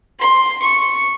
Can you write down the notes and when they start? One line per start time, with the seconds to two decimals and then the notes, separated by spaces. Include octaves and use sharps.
0.20 C6
0.62 C#6